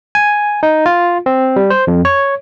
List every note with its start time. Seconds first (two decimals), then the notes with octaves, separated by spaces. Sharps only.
0.15 G#5
0.63 D#4
0.86 F4
1.26 C4
1.56 G3
1.70 C5
1.87 F2
2.05 C#5